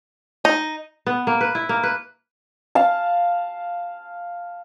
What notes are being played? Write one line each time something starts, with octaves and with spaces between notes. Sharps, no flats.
D#4
B3
A#3
B4
E4
A#3
B4
F5 A5